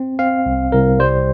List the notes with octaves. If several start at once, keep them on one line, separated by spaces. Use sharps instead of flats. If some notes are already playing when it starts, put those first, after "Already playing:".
Already playing: C4
C4 F5
C2
C2 A#4
G3 C5